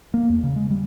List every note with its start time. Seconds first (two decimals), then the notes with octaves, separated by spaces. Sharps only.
0.14 A#3
0.29 E2
0.43 C#3
0.56 G#3
0.70 G3